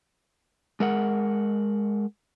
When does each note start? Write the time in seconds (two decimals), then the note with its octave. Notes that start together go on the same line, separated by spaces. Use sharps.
0.80 G#3 A#4 F#5